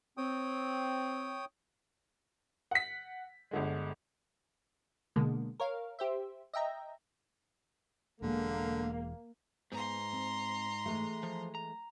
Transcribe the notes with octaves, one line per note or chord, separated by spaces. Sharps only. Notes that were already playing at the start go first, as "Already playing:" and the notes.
C4 C#5 G5 D#6
F#5 B6
G1 D3 G#3
B2 D3 G#3 A#3
A#4 C#5 F5
G4 C5 E5
D#5 E5 G5 A#5
E1 E2 D3 G#3 A#3
G#2 B3 A#5 C6
C4
E3 G#3 A3
F3
A#5